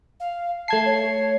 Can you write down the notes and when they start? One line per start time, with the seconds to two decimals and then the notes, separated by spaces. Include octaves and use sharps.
0.20 F5
0.68 A3 A5 G#6 C7
0.85 C#5